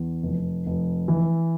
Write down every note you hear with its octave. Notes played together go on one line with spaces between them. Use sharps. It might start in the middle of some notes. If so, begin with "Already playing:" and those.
Already playing: E2
F1
F1
E3